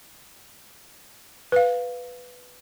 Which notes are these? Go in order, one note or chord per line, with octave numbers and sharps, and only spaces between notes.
B4 F5